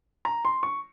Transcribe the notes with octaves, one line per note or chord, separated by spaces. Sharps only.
A#5
C6
C#6